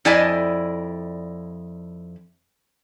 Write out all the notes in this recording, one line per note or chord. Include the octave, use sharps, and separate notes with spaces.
F2 E4 D5 D#5 G#5 A5